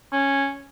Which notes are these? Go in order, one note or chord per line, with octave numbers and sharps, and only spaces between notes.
C#4